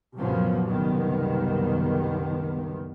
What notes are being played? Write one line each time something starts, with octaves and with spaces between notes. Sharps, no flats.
F#1 C2 A#2 F3 F#3 B3
F#1 C2 D#3 B3